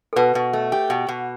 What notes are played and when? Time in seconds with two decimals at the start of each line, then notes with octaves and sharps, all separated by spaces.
0.13 A4
0.16 B2 B4
0.35 B2
0.53 A3
0.72 G4
0.90 B2
1.08 B2